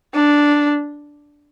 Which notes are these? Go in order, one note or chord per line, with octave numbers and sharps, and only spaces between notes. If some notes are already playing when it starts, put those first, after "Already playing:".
D4